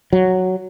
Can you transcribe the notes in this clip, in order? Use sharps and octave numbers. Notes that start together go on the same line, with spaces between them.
F#3